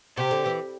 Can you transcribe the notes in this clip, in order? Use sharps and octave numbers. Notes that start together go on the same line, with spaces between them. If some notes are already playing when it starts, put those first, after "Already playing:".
C3 G4
D3
E3